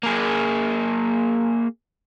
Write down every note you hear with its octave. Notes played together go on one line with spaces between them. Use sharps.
A#3 G#4